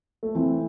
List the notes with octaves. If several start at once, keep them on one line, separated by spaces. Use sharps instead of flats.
A3
E3 C4